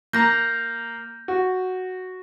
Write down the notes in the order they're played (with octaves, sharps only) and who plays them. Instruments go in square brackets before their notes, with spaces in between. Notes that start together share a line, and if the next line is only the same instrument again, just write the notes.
[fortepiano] A#3 A#5 [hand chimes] G6 A#6
[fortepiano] F#4